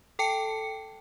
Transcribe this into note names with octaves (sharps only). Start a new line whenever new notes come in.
A4 G5 A5 C#7